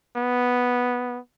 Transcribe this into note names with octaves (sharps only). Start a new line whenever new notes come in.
B3